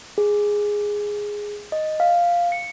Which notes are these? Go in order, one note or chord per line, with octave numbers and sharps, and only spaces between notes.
G#4
D#5
F5
C#7